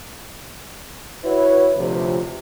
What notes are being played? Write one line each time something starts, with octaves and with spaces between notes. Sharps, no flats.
E4 F#4 B4 C#5
D2 C3 F3